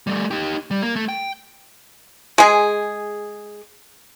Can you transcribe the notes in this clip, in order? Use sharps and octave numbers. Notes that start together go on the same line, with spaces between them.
G3 A3
D#4 G4
G3
A#3
A3
G5
G#3 G#4